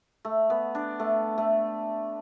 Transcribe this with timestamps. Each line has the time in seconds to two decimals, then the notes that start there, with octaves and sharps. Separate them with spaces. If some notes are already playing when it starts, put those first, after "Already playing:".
0.25 A3
0.50 B3
0.75 D4
1.00 A3
1.38 A3